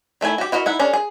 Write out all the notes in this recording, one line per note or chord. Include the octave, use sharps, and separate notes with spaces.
D#3 A3 E4 G#5
F#4 G4
E4 F#4 A#4 D#5
D#4 E4 F#5
C#4 D4 G#4 A#4
G#4